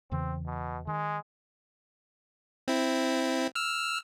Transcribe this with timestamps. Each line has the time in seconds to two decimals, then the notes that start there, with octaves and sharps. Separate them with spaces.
0.12 E2 C#3 E3 C4
0.46 B2
0.87 D#3 G#3
2.68 C4 E4
3.55 E6 F6